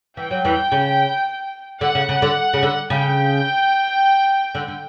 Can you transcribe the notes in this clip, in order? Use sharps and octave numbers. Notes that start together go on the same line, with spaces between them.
E3 G5
F#3
E2 E3
C#3
D3 F#5
C#3
C#3
D3
C#3
D3
C#3 G5
D3
D3